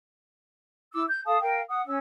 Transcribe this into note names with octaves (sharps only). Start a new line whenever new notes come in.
E4 D6 E6
G6
A4 F5 A5 D#6
A#4 F5 G5
F#5 D#6
C#4 E6